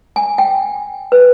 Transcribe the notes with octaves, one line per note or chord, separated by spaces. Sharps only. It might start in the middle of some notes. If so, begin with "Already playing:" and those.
G#5
G5
B4